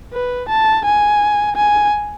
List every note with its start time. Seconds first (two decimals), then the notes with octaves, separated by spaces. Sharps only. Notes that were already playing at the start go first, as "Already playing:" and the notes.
0.13 B4
0.49 A5
0.85 G#5
1.56 G#5